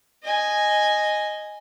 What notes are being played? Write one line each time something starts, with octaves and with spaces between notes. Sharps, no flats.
D#5 G#5